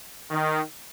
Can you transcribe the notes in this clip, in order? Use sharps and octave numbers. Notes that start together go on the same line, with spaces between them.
D#3